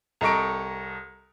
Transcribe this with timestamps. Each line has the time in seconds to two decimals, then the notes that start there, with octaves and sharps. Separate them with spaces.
0.21 C2 A4 D#5 A#5 C#6 D7